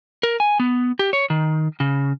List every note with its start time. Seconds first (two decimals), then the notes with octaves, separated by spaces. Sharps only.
0.23 A#4
0.40 G#5
0.60 B3
0.99 G4
1.13 C#5
1.30 D#3
1.80 C#3